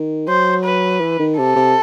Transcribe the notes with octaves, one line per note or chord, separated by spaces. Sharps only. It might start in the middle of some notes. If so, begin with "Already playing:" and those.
Already playing: D#3
F#3 C5
B4
E3
D#3
C3 A4
C3